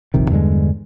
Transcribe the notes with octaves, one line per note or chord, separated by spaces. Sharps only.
F1 A#1 C3 D#3
E2 G2 D3 G#3